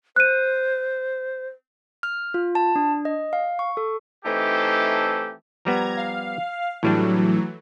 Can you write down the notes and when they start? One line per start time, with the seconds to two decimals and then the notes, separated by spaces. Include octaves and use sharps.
0.16 C5 F#6 D#7
2.03 F6
2.34 F4
2.55 A5
2.76 D4
3.05 D#5
3.33 F5
3.59 C#6
3.77 A4
4.25 E3 A3 C4 D#4 G4 A4
5.65 F3 G3 B3 A#5 G#6
5.97 F5
6.83 A2 E3 F#3 G3 A3 D4